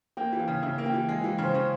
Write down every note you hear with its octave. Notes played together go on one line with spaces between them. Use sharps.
A#3 G5
E3
F5
C#3
C#3 E5
A#3
G5
E3
G#3 F5
E3
C#3
C5
C#3 C#5